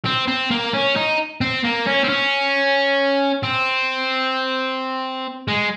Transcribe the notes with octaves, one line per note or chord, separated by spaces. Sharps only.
C4
C4
A#3
C#4
D#4
C4
A#3
C#4
C4
C#4
C4
G#3